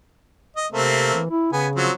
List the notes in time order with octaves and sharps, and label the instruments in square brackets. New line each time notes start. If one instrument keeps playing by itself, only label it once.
[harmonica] D#5
[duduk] C3 [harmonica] A3 A#3 C4
[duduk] E3
E4
[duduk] C#3 [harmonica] B3 G#5
[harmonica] F3 F#3 C4